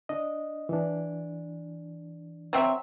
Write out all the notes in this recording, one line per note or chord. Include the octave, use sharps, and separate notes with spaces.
D4 D#5
E3 D4
F#3 C4 E5